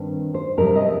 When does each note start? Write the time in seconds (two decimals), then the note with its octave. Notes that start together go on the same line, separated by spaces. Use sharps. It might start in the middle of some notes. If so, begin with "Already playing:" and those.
Already playing: G2 D#3 C4
0.34 C5
0.57 F2 C3 G3 A#4
0.76 D#5